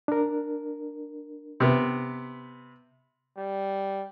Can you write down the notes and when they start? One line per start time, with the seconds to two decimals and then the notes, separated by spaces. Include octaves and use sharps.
0.08 D4 A#4
1.60 C3 B3
3.38 G3